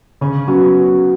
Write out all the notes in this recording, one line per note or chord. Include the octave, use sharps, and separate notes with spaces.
C#3 C#4
F#3 B3 C#4 F#4